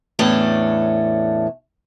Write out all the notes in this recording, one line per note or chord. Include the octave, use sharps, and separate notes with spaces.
E2 A2 A3 C#4 D4